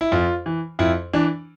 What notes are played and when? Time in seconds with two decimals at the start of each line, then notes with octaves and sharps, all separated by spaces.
0.01 E4
0.12 F2 F4
0.46 E3
0.79 F2 E4
1.13 E3 D4